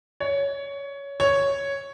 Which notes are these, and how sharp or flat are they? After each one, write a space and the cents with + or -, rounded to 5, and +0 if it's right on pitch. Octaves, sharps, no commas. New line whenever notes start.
C#5 +15
C#5 +0